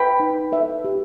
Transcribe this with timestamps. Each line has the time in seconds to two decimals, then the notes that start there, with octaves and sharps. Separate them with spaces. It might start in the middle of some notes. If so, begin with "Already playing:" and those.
Already playing: B4 G5 B5
0.20 D#4
0.52 B4 E5
0.84 G4